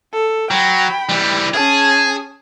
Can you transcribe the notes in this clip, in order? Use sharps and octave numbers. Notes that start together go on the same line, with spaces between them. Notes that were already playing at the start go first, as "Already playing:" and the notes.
A4
F#3 G5 B5
E3 G3
C#4 G#4 A5